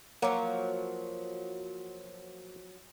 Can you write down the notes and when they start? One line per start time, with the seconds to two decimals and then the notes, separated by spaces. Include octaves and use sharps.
0.22 F3 F#3 A#3